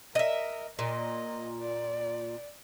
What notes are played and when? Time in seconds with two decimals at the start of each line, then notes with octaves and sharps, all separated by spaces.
0.15 A#4 D#5 E5
0.79 A#2 D#5
1.60 D5